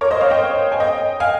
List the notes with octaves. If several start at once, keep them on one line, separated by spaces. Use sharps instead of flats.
A#4 C#5
C5 D#5
C#5 F5
D#5 G5
G#5
D#5 G5
F5 G#5